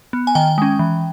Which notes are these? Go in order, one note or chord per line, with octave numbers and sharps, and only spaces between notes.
B3
G#5
D#3 G5
G#3 C#4
E3